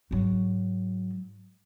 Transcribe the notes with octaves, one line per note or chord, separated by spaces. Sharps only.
G#2 F#3